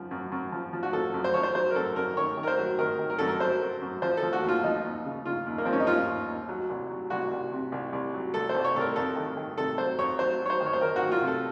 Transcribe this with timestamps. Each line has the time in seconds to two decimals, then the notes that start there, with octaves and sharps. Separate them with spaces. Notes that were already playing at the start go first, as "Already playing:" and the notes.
Already playing: F#2 F3
0.11 F#2
0.32 F#2
0.52 F3
0.73 F3
0.83 F#4
0.93 F3 A4
1.14 F#2
1.24 C5
1.34 F3 C#5
1.43 C5
1.55 F#3 C5
1.70 A#4
1.75 F#2 A4
1.96 F#2 A#4
2.17 D#3 C#5
2.37 D#3
2.43 A#4
2.47 C5
2.58 F#3
2.79 D#3 A#4
2.99 D#3
3.10 A#4
3.18 F#2 A4
3.27 A#4
3.40 F#3 C5
3.61 F#3
3.81 F#2
4.02 F3 C5
4.17 A4
4.23 F3
4.33 F#4
4.43 D#2
4.48 F4
4.63 F3 D#4
4.84 D#2
5.05 C#3
5.25 C#3 F4
5.46 D#2
5.58 A#3
5.65 F3 C4
5.73 C#4
5.80 D#4
5.87 D#2 F4
6.08 D#2
6.28 D#2
6.49 F#3
6.69 C2
6.90 F#3
7.10 C2 F#4
7.31 C2
7.52 C3
7.72 C2
7.93 C2
8.14 F#3
8.34 C2 A4
8.49 C5
8.54 C2
8.64 C#5
8.75 C2 A4
8.80 A#4
8.96 F2 A4
9.16 D#3
9.37 D#3
9.57 C3 A4
9.78 F#3 C5
9.98 F2 C#5
10.19 F#3 C5
10.39 F#3
10.46 C#5
10.50 C5
10.60 D#3
10.66 C#5
10.73 C5
10.81 D#3 A#4
10.96 F#4
11.02 D#3
11.11 F4
11.22 C3
11.27 A4